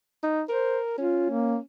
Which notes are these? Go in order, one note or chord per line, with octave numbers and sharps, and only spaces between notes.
D#4
A#4 C5
C#4 F4
A#3